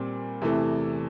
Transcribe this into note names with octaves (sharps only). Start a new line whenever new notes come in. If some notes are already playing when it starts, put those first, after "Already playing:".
Already playing: A#2 G3 C4
E2 C3 E3 A3